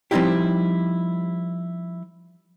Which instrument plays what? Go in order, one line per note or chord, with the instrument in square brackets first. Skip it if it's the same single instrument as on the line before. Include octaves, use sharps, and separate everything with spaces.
[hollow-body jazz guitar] F3 G3 C4 D#4 E4 G4